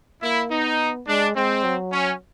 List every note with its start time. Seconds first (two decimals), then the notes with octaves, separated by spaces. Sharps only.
0.22 A#3 E4
0.51 B3 D#4
1.07 G#3 D4
1.36 G#3 C4
1.64 F#3
1.92 C#4